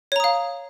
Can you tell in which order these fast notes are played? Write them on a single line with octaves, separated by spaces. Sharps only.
C#5 A#5 D#6 F5